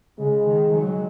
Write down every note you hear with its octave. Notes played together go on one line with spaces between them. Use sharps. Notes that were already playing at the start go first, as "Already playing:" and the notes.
C#3 G#3
D#3
F#3 G#3